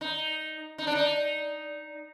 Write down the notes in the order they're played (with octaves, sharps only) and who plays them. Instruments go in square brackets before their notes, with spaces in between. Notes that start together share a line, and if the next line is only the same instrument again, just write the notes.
[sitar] D#4
D#4
D4
D#4